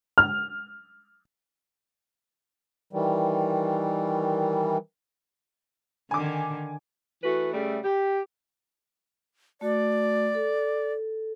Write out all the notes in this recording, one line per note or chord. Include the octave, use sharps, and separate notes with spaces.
F6
D#3 E3 G3
D3 D#3 G#5 D6
E3 A3 F#4 B4
C#3 G3 A3
G4
A3 F#4 D5
A4